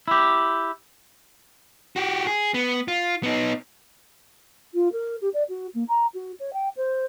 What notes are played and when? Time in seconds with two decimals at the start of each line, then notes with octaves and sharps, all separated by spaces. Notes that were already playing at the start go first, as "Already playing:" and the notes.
0.08 E4 G4
1.96 F#4 G4
2.27 G#4
2.54 B3
2.88 F4
3.23 B3 D#4
4.74 F4
4.92 A#4
5.21 G4
5.33 D5
5.49 F#4
5.74 A#3
5.88 A#5
6.14 F#4
6.39 C#5
6.53 G5
6.76 C5